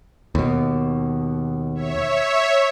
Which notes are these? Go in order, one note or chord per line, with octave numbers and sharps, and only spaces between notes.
D#2 B2
C#5 E5